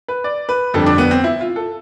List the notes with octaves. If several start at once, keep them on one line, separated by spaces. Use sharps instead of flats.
B4
D5
B4
F2 D3 G3 A4
D4
B3
C4
E4
F4
A4